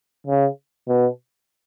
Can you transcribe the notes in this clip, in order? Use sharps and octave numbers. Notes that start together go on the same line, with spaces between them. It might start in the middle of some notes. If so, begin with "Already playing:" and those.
C#3
B2